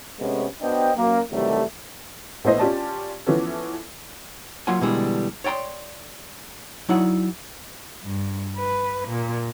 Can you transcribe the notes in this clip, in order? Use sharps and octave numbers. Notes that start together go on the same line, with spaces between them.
C3 G#3 A3 B3 C#4
B3 D4 F#4 C5 D#5 G5
F#2 A#3
C3 D#3 E3 F#3 G3 A3
A#1 A3 B3 E4 C5 D#5
C#4 F4 G4 D5 A5
E3 F3 B3 C#4 A4
F#3 A#3 F4 F#5 G#5
B2 D3 E3 G3 G#3
C#5 D5 G5 A#5 C6
F#3 D#4 E4 D5 F#5
G2
B4
A#2